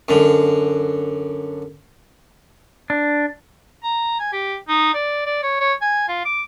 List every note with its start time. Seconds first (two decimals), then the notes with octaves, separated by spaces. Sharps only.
0.09 F#2 D3
2.90 D4
3.84 A#5
4.20 G#5
4.33 G4
4.68 D#4
4.94 D5
5.26 D5
5.43 C#5
5.60 C#5
5.81 G#5
6.08 F4
6.25 D6